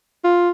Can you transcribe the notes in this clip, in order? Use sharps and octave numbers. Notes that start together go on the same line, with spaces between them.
F4